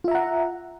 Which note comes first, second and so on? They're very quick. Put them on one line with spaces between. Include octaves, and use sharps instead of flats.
F4 E5 A#5 F#5